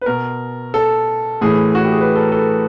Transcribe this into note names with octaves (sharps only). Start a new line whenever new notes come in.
B4
B2 A#4
A4
A2 E3 G#4
F#4
G4
G#4
B4
A4
A#4
A4